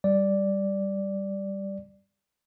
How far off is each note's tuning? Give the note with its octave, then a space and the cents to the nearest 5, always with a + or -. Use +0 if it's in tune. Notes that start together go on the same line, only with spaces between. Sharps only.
G3 +0 D5 +0